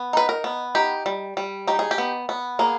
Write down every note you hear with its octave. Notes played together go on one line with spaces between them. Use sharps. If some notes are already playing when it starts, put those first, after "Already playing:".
Already playing: B3
D#4 B4
A#4
B3
D#4 G4
G3
G3
D#4 G4
G#4
G4
B3
B3
A#3 G#4